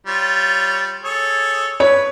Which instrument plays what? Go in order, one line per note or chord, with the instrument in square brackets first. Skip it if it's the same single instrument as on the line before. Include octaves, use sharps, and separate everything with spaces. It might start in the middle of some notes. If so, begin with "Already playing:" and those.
[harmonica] G3 F4 C#5
G#4 A4 C#5
[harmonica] B4 [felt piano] C#5